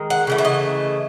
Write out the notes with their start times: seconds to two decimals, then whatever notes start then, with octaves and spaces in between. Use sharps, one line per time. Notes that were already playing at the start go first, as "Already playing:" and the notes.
Already playing: D#3 G#3
0.10 F#5
0.27 C#3 E3 A3
0.38 E5
0.45 D#5